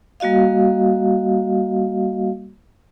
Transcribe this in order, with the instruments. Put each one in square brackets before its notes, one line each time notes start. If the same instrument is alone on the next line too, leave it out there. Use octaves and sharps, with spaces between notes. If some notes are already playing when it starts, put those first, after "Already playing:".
[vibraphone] G3 A#3 F#4 D#5 F5